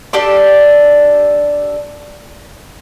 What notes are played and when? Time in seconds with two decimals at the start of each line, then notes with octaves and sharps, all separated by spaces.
0.13 D4 G4 A4 D5